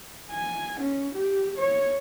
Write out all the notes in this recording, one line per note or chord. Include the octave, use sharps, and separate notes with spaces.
G#5
C#4
G4
C#5